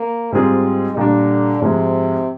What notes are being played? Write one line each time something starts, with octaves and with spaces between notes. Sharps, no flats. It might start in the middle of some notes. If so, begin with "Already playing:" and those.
Already playing: A#3
G#2 G3 G#3 C4 F4 G#4
A#2 D3 G3 D4
G#2 C3 F3 G#3